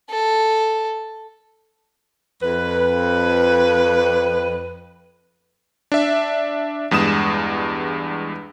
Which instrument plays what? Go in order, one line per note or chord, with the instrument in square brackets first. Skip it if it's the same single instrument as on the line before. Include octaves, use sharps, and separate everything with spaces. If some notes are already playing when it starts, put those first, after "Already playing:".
[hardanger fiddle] A4
[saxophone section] F2 B4
[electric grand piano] D4 E5
E2 G2 G#3 D#6 E7